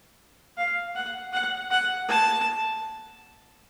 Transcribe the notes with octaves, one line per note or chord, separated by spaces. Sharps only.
F5
F#5
F#5
F#5
A5